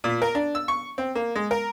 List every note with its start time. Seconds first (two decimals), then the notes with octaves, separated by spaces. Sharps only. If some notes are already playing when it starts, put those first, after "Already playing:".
0.04 A#2
0.22 A#4
0.35 D4
0.55 E6
0.68 C#6
0.98 C4
1.15 A#3
1.35 G#3
1.51 A#4